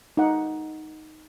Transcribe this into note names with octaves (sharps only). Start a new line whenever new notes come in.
D#4 F#5